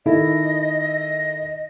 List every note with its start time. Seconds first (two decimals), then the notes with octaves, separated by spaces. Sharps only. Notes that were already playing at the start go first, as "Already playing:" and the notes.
0.06 D#3 E4 A4 D#5